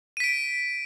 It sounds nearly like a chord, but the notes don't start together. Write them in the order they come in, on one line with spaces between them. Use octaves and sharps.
D#7 B6 D7